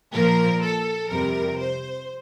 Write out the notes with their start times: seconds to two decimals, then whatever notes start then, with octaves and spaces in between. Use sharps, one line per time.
0.13 A#2 F3 A#3 A#4
0.62 A4
1.10 F2 C3 G3 A#4
1.59 C5